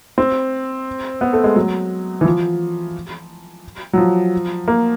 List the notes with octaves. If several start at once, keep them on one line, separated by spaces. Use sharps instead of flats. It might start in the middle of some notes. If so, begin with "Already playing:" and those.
C4
B3
A3
G#3
F#3
E3
F3
F#3
F3
A#3